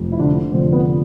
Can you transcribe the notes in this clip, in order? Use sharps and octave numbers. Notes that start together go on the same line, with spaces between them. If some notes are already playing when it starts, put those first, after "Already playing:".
Already playing: F1 F2 F3
E4
D3 D4
F1 F2 D3 F3 C4 C5
B3 B4